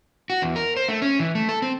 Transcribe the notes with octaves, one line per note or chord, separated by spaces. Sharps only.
F#4
E2
A#4
C5
A3
C#4
E3
A3
A4
C4